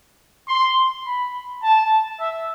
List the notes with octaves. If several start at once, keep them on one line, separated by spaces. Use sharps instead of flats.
C6
B5
A5
E5